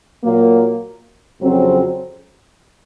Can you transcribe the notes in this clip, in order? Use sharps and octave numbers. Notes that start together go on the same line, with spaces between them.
A#2 F#3 A#3
F2 C#3 F#3 C4